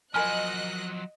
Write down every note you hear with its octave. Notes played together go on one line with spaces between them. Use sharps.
F3 F#3 A#4 D#5 G#5 B5 F6 F#6